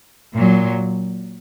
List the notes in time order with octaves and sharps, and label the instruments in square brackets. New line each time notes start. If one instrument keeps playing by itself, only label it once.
[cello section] A#2 F#3